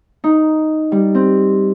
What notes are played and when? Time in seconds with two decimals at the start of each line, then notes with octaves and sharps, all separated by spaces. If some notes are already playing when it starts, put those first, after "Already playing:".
0.24 D#4
0.92 G3
1.15 C4